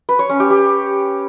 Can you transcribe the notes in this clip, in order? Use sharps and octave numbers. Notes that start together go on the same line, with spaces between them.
B4
C#5
C#4
G4
G4